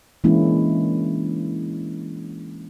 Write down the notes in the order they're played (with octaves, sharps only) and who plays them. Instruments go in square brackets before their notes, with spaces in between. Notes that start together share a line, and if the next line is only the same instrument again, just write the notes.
[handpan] E3 G#3 A#3 C#4 D4 E4